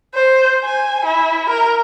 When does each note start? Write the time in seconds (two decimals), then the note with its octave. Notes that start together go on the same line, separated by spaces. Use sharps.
0.15 C5
0.65 G#5
1.05 E4
1.50 A#4